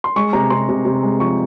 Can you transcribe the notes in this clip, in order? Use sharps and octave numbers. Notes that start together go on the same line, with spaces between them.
C6
G#3 C#6
C3 A#5
C3 C6
C3
C3
G#3
F3 C#6